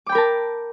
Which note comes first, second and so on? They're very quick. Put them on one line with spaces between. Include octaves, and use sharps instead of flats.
D6 G5 B5 A#4 A5